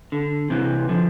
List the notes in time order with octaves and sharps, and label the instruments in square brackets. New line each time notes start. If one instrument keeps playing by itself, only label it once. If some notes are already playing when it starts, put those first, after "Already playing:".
[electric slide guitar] D3
C3 E3
D3 F3